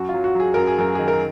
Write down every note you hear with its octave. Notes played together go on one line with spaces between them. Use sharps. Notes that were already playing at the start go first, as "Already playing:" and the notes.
Already playing: F#2 F#4
F4
F#3
F#4
F#3 G#4
F#2 A#4
G#4
F#2 A#4
D#3 G#4
A#4